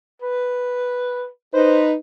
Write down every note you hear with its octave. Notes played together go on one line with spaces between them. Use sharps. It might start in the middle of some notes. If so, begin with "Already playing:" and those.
B4
D#4 B4 C5